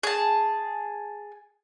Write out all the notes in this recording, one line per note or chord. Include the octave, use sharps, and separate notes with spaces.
G#4 A5